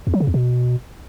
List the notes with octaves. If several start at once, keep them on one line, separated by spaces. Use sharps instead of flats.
E2
F#3
C#3
E2
B2